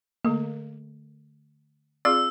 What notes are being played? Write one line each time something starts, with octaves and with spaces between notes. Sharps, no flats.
D3 A3 A#3 A#4
C4 F4 G#4 D5 E6